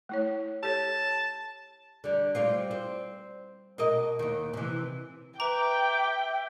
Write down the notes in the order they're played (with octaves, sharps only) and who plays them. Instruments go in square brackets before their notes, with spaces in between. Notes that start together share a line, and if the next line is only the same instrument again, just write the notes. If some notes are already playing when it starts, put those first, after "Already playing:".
[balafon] A3 E4 C#5
[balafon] G4 A4 C#5 [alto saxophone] A5
[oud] D3 G3
G3 C4 F4
C4
B2 A#4 D#5
D#2 D#3
C3 E3
[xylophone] B4 A#5 [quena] E5 [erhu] G5 [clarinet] D6